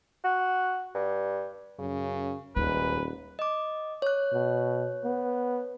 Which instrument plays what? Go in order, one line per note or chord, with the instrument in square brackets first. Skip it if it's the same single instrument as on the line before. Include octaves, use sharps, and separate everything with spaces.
[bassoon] F#4
G2
[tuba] F#2 [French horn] C#3
[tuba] D#1 [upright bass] D#2 [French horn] G#2 [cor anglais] B4
[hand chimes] D#5 D6
C#5 F#6
[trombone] B2
B3